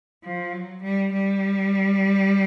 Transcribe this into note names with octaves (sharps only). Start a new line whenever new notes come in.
F3
F#3
G3
G3